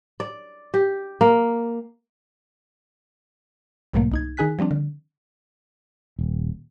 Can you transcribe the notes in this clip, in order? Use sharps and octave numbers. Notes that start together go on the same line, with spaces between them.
D5
G4
A#3
B1 G#2 B2 F#3 A3 A#3
C2 D#4 G#6
D#3 D#4 G#4 G#5 F#6 B6
F3 G3 C4 D4
D3
D#1